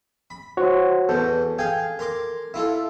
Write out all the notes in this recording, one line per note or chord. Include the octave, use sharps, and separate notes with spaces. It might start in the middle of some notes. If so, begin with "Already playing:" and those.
B5
F#4 C5 C#5 F#5 C6
E2 B2 A4 G6
G#4 F5 G5 G#6
A#4 C6 D6
E4 F4 A4